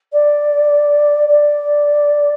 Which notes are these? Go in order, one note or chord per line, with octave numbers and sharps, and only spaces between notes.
D5
D5